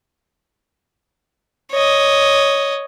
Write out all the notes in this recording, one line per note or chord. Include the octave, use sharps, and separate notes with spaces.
C#5 D#5